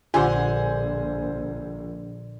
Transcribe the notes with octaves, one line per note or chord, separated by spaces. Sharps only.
A#1 D3 F4 G4 C5 G#5 C6